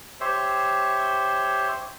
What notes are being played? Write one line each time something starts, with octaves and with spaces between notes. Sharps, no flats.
G4 C5 C#5 E5